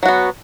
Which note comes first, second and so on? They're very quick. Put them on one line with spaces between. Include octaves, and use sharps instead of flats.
F#3 F#4 B3